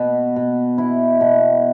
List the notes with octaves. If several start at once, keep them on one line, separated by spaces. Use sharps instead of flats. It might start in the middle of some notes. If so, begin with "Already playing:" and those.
Already playing: B2
B2
E4
B2